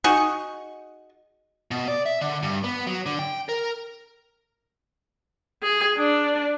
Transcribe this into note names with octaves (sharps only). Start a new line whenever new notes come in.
D#4 F#4 G#4 C#6
B2
D5
E5
D3
G2
B3
F#3
D3
G5
A#4
G#4
D4